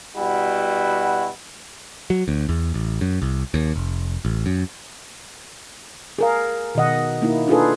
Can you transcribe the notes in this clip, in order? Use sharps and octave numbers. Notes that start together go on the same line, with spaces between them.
B2 G3 E4 F#4
F#3
D2
E2
A1
F#2
C2
D#2
F1
A1
F#2
G#4 A#4 F5
B2 D#3 D#5 F#5
A#3 D#4 E4
D4 D#4 F4 G#4 A4 B4